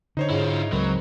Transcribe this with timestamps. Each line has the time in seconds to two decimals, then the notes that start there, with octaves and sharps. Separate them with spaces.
0.17 D3 D#4 C5 C#5
0.30 G#2 E4 F4
0.72 C#2 G#2 F#3 C4 A#4 B4